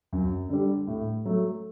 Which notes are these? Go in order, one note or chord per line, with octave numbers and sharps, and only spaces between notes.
F#2
D3 G3
A2
F#3 A3